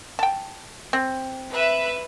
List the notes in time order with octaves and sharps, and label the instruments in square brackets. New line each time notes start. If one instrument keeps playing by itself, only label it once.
[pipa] G5 A5
C4
[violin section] B4 E5